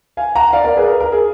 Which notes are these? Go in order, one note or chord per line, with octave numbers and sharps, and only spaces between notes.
F5 G#5
F#5 A#5
D5 F5
A#4 D5
G#4 B4
A#4
A#4
G#4